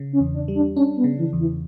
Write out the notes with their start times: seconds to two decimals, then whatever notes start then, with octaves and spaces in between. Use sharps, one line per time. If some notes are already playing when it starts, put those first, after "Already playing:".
Already playing: C#3
0.13 C#4
0.20 E2
0.34 D4
0.48 G3
0.55 D4
0.76 C#4 D4
0.97 B3
1.04 C#3
1.18 E3
1.33 E2
1.39 E3